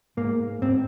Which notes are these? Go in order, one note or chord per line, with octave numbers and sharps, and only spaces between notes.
G#2 A#3
G#2 C4